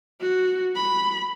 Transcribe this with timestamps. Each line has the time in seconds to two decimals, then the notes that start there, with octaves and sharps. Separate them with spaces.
0.21 F#4
0.75 B5